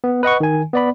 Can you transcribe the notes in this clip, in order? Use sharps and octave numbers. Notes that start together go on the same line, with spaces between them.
B3
B4 D#5 F#5 C#6
D#3 G#5
B3 D5 B5